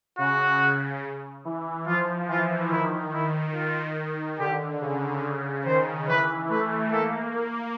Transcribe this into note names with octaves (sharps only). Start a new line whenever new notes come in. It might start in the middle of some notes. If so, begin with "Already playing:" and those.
C#3 F#4
E3
F3 F4
E3 F4
D#3 E4
E4
F4
D3 G4
C#3
C#3
D#3 C5
E3 B4
A3 B4
A#3 A4